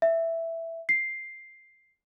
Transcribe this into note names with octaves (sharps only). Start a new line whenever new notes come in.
E5
C7